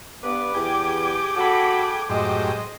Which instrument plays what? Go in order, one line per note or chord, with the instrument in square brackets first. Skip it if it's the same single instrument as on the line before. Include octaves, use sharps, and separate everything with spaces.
[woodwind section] G2 B4 [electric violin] B3 [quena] D6
[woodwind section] E2 [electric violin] G4 [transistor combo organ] G#4 G5
[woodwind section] F#4 [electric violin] A4 B5
[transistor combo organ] F#2 A2 G4 [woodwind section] G#3 [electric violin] C5 D#5